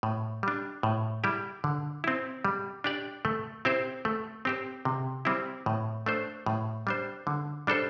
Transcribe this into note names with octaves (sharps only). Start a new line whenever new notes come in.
A2
G3 D4
A2
G3 E4 G4
D3
C4 E4
G3
D4 G4 D5
A3
C4 E4 G4 C5
A3
C4 G4 C5
C3
G3 C4 E4
A2
A3 D4 C5
A2
G3 D4 C5
D3
G3 D4 A4 C5